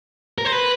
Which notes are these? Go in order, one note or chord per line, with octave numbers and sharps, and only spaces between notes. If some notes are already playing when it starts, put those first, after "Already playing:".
A#4
C5
B4